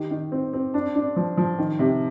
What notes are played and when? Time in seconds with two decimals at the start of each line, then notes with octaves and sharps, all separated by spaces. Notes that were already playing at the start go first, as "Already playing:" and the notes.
Already playing: D#3 G4
0.11 D#3
0.32 C4
0.53 C4
0.74 D4
0.95 D4
1.16 F3
1.37 F3
1.58 D#3
1.79 C3